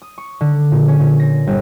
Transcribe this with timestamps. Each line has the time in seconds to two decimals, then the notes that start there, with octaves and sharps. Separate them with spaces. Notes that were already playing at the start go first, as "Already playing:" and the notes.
0.02 D#6
0.18 C#6
0.41 D3
0.72 A#2
0.88 C#4
1.00 A#2
1.20 A#6
1.47 G1